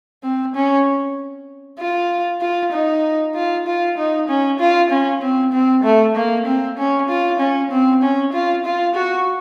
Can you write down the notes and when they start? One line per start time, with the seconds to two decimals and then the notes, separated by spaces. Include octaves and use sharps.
0.23 C4
0.55 C#4
1.79 F4
2.41 F4
2.73 D#4
3.35 F4
3.67 F4
3.98 D#4
4.28 C#4
4.60 F4
4.90 C#4
5.22 C4
5.53 C4
5.84 A3
6.16 A#3
6.46 C4
6.78 C#4
7.09 F4
7.40 C#4
7.71 C4
8.02 C#4
8.33 F4
8.65 F4
8.95 F#4